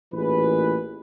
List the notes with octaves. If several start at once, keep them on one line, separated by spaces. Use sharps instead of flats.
A1 A#2 E3 G#4 B4